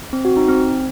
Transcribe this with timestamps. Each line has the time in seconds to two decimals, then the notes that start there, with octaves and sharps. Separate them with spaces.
0.13 C4
0.25 F#4
0.37 D#4
0.49 C4